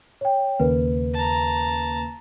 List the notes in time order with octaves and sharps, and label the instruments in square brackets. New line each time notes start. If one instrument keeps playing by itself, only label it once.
[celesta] C#5 G5
[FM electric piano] D#2 C#3 A#3 [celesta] B4
[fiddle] A5 A#5